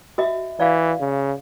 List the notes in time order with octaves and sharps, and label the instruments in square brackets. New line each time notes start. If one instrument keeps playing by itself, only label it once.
[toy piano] F#4 D#5 E5
[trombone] E3 [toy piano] D5 F5
[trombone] C#3